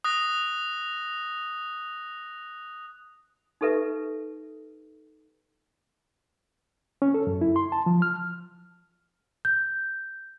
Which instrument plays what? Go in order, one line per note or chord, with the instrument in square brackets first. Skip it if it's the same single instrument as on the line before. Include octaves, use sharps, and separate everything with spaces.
[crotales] D#6 F#6 A#6
[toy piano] D#4 G4 A4 B4 E5
[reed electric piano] C#4
A4
F#2
E4
C6
A5
F3
F6
[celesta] G6